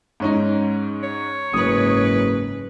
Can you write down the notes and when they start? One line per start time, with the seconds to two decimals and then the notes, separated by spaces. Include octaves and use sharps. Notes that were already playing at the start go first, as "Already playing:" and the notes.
0.20 G#2 C#4 D#4
1.03 C#5
1.54 F#1 G#2 B4 D#6